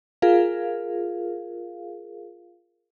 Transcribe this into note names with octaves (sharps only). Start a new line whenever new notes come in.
F4 G#4 A#4 F5